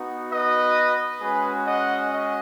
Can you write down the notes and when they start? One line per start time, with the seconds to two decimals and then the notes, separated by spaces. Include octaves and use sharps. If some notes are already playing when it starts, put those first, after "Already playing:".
Already playing: B3 D#4 F#4
0.31 B4 D#5
1.21 G#3 C#4 F#4 G#4 B4
1.66 D#5 F#5
2.11 D#5